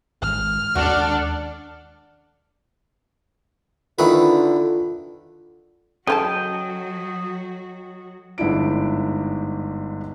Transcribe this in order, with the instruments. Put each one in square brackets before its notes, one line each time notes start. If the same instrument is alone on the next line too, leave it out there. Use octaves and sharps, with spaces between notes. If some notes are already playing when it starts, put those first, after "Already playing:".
[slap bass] G#1 G#3 [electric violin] F6
[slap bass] D#2 G#3 C#4 [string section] D4 A4 D5 [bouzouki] F#4
[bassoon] D3 [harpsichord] D#3 E4 B4 [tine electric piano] F4
[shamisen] C#3 F4 A5 [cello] F#3 F#4 [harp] A4 [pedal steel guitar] D#5 G5
[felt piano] G1 G#2 D4 E4 D7